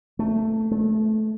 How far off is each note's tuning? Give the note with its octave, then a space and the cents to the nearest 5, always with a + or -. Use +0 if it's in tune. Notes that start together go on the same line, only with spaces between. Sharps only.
A3 +5
A3 -20